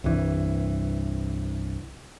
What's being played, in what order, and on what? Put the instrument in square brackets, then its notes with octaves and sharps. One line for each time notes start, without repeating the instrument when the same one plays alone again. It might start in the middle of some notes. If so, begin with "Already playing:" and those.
[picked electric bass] C2 G2 E3